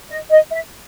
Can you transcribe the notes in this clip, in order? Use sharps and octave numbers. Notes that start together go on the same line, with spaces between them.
D#5
D#5
E5